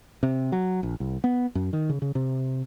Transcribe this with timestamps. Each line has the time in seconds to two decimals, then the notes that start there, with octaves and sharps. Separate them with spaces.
0.23 C3
0.52 F#3
0.83 A#1
1.00 C2
1.24 B3
1.55 F#2
1.73 D#3
1.89 C#3
2.02 C#3
2.15 C3